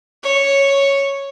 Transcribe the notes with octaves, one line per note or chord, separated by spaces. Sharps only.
C#5